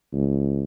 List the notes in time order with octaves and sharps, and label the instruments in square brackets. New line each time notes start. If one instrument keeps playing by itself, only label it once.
[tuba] C#2